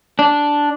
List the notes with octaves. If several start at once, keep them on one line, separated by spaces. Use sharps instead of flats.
D4